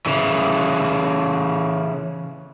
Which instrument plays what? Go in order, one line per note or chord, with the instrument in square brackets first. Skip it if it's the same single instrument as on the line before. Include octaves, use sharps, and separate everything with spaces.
[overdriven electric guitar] C#3 E3